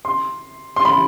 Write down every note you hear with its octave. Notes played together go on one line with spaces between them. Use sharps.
C6
C6
B5